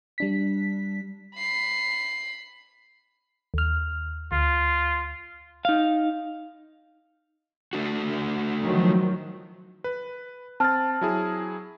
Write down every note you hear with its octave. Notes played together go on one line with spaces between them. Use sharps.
G3 D4 B6
B5 C7
D#2 F6
D2 F4
D#4 F5
A3 D4 F#4
D#3 F3 F#3
B4
C4 A5 F6 A6
F#3 E4 G#4